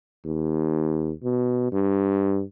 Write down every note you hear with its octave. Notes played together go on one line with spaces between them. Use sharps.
D#2
B2
G2